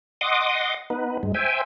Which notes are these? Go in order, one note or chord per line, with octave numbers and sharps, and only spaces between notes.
D#5 F#5 C6 D6 D#6
B3 D#4 B4
G2 G#3
C5 E5 G5 G#5